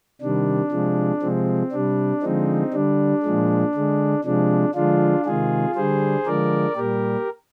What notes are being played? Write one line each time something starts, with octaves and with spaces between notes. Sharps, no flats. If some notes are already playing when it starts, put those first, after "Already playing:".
C3 D#3 G3 D4
C3 F3 G#3
C3 F3 G#3 C4
C3 G3 D4
D3 F3 G#3 C4 D#4
D3 G3 D4
A#2 F3 G#3
D3 G#3
C3 F3 G#3 D4
D3 F3 G#3 D4 F4
C3 D#3 G#3 F4 G#4
D3 G3 G#4 C5
D3 F3 G#3 A#4 D5
A#2 G3 G4 A#4